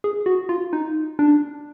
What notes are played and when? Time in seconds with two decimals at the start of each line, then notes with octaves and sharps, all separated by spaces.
0.04 G#4
0.26 F#4
0.49 F4
0.73 D#4
1.19 D4